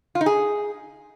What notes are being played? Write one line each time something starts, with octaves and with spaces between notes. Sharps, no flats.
F4
D#4
G#4